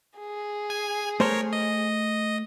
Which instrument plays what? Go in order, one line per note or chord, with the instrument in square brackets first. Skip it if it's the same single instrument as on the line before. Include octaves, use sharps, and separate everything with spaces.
[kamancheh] G#4
[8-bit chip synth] G#5
[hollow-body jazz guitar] A3 C5 C6 [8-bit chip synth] A#4 C#5
[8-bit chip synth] D#5